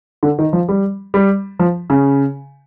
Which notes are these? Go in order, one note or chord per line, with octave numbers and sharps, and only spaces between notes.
D3
D#3
F3
G3
G3
F3
C#3